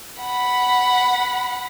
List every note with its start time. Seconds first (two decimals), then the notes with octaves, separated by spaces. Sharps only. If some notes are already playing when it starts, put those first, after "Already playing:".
0.20 F#5 B5